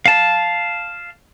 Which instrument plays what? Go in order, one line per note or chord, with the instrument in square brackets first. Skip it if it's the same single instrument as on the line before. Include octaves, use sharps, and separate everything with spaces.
[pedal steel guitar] F5 A5